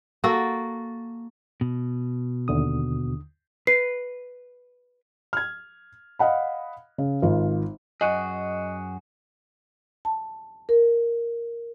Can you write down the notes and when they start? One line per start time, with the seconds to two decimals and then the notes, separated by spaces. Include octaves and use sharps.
0.24 A#3 F#4 A4
1.61 B2
2.48 D#2 D3 D#6
3.67 B4 C7
5.33 F6 G#6
6.19 D#5 F5 F#5 B5
6.98 C#3
7.22 G#1 F4
8.01 F#2 F#4 G#4 D#5
10.05 A5
10.69 A#4